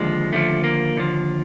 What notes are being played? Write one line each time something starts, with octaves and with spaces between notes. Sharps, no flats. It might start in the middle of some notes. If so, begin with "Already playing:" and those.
Already playing: D#2 D3 F3 G#3
D#2 D3 F3 A3
A#3
D#2 D3 F3